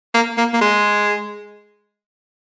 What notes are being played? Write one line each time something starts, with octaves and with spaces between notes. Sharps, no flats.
A#3
A#3
A#3
G#3